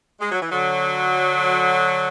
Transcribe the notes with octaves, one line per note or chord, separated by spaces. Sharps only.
G#3
F#3
E3
D3 F#3